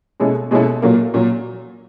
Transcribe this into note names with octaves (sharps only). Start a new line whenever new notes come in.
B2 G#3 C#4 E4 A4
B2 G#3 C#4 E4 A4
A#2 F#3 A#3
A#2 F#3